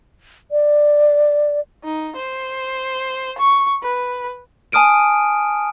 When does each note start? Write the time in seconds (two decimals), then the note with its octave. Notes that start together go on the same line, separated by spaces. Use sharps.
0.51 D5
1.84 D#4
2.16 C5
3.38 C#6
3.83 B4
4.72 G#5 A5 D#6 F6 D7 D#7